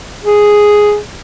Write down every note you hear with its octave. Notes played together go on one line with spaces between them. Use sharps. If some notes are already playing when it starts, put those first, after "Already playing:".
G#4